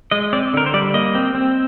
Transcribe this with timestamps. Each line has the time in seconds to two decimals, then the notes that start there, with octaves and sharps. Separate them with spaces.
0.11 G#3 D#5
0.33 C4 D5
0.54 D3 A#4
0.66 C5
0.74 G3 D5
0.94 A#3 D#5
1.15 C4
1.35 C4